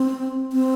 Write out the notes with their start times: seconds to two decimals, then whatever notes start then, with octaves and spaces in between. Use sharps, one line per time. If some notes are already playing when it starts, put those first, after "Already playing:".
Already playing: C4
0.53 C4